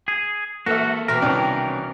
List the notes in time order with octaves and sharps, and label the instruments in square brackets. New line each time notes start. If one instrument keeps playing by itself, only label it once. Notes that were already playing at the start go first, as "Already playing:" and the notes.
[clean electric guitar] G#4
[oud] E3 [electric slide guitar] A#3 A4 [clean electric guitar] F#4 [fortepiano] E5 F6
[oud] B2 E3 C4 [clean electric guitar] A#4
[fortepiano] C2 D#3 D4 [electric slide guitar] C#4